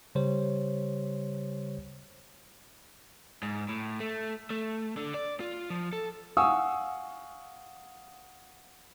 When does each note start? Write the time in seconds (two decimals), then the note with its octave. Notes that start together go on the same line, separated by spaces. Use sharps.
0.15 C#3 G3 G4 C5 C#5
3.43 G#2
3.69 A2
4.00 A3
4.50 A3
4.97 D3
5.14 D5
5.40 F4
5.70 F3
5.93 A4
6.37 F5 F#5 G#5 C#6 D#6 E6